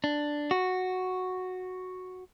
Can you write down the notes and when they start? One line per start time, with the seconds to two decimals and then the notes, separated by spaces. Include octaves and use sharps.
0.04 D4
0.51 F#4